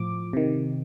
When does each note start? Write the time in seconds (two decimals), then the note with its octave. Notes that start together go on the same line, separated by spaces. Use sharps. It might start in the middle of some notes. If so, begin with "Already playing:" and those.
Already playing: A2 F3 D6
0.33 C3 D#3